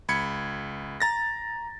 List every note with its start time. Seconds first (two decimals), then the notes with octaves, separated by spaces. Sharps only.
0.08 C#2 B5 G#6 C#7
1.00 A#5 A6 A#6